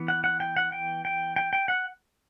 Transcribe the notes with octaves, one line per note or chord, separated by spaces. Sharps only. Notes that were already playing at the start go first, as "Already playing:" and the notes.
Already playing: E3 B3
F#5
F#5
G5
F#5
G5
G5
G5
G5
F#5